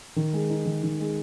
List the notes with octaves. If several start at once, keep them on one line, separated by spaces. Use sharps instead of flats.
D#3
G#3
D#4
D#3
D#3
G#3